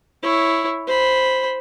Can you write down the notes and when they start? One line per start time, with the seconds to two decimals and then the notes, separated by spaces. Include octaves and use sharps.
0.23 E4 C#5
0.87 C5 B5